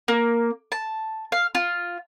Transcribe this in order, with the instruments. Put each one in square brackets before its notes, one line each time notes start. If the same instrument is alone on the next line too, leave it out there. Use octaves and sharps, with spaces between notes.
[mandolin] A#3
A5
F5
F4